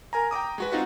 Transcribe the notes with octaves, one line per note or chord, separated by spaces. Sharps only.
A#4 G#5 A#5
G5 A#5 D6 D#6
G#3 F#4 B4
C4 D#4 F4 F#4 F#5